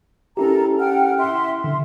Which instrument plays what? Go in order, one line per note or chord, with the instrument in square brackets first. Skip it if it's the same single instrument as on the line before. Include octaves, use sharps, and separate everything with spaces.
[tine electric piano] C#4 E4 G4 [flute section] A4 A#4 A#5
[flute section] F#5 G5 F6
E5 C6
[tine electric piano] D3 [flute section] C6